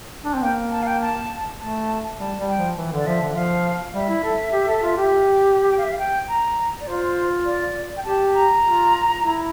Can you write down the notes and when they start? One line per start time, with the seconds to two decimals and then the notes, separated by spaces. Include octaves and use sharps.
0.25 D4
0.34 C4
0.43 A#3 G5
0.71 A5
0.83 F5
0.87 G5
1.01 A5
1.60 A3 A5
2.18 G3 A5
2.38 G3
2.48 G5
2.58 F3
2.77 E3
2.92 D3 D5
3.07 F3 E5
3.21 D3
3.35 F3 F5
3.94 G3 E5
4.09 E4
4.24 A4
4.53 G4
4.68 A4
4.82 F4
4.97 G4
5.69 G5
5.77 F5
5.83 E5
5.92 F5
5.99 G5
6.29 A#5
6.80 D5
6.86 F4 C5
7.45 D5
7.97 G5
8.04 G4 A5
8.34 A#5
8.62 F4
9.21 E4